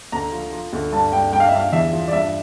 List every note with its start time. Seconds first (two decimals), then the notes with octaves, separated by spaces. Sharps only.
0.12 D2 A#5
0.33 F3
0.52 F3
0.73 D2
0.92 G2 A5
1.13 G2 G5
1.32 G2 G5
1.40 F5
1.48 E5
1.53 G2 F5
1.72 E2 E5
1.93 F3
2.08 D5
2.13 G2 E5